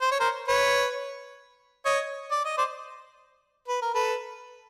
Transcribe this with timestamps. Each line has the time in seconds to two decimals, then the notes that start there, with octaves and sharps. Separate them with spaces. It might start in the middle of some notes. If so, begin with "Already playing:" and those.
0.01 C5
0.11 C#5
0.20 A#4 C5
0.48 B4 C#5
1.85 C#5 D#5
2.31 D5
2.45 D#5
2.58 C5 D5
3.68 B4
3.82 A#4
3.94 A4 B4